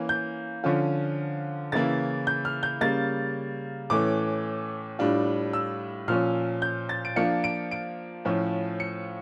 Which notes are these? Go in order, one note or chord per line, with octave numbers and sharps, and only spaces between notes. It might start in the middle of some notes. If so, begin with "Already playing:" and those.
Already playing: E3 A#3 C#4
G6
D3 F3 C#4 F4
C#3 E3 A#3 E4 A6
G6
F6
G6
C#3 G3 A#3 A6
A2 E3 A3 C#4 D6
A2 G3 D4 F4
E6
A#2 F3 C#4 F6
G6
A6
D7
F3 A#3 D4 F4 C#7
D7
D7
A2 F3 C#4 F4
C#7